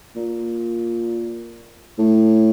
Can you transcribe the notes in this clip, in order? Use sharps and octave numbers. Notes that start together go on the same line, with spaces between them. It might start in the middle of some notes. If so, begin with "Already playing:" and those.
A#2
A2